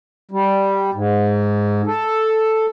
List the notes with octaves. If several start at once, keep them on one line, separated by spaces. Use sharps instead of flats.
G3
G#2
A4